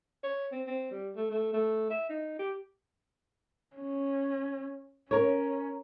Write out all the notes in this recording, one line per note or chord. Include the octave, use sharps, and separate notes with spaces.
C#5
C4
C4
G3
A3
A3
A3
E5
D#4
G4
C#4
C#4 A#4 C#5